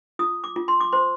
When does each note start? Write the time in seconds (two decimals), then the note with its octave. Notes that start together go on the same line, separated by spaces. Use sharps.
0.19 F4 D#6
0.44 D6
0.56 F4
0.68 C6
0.80 D6
0.92 C5 C6